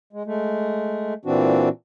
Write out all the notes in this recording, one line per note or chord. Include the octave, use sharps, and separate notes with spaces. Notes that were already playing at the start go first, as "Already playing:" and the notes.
G#3
G#3 A3
A#2 E3 C4 D4 F#4